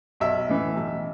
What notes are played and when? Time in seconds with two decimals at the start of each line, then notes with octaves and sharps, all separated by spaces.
0.20 B1 E5
0.49 A2 E3
0.76 B1